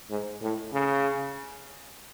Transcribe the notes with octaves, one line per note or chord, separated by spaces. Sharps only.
G#2
A2
C#3